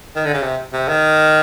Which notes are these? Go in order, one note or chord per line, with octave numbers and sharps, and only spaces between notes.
D#3
D3
C#3
C3
C3
D#3